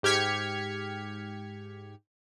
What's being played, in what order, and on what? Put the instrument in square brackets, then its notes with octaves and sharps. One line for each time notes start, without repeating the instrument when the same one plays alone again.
[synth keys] G#2 G4 F6 G#6 B6 C#7